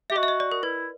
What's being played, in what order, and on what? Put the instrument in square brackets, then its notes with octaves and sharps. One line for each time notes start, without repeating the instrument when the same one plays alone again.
[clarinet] G4 [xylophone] E5
[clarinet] F#4 [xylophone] D#5
[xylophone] E5
D#5
D5
A#4
[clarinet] E4 [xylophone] B4